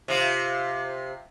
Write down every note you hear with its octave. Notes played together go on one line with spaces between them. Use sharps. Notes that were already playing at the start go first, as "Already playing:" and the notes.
C3 F4